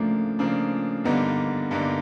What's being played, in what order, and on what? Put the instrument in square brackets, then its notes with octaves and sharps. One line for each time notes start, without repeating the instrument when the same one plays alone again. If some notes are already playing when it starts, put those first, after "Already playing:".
Already playing: [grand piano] C#3 F3 A#3 D4 [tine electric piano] A3
[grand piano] C#3 F3 A#3 D4
[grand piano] G2 D3 G3 A#3 D#4 [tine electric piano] B3
[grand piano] G2 D3 G3 A#3 D#4